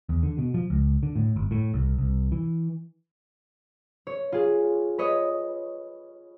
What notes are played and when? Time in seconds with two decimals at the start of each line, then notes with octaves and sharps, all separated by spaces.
0.09 E2
0.23 D3
0.38 B2
0.54 F3
0.70 C#2
1.03 D3
1.16 A2
1.36 G1
1.51 A2
1.74 C2
1.98 C2
2.32 E3
4.07 C#5
4.32 F4 G#4
4.98 B4 C#5 D#5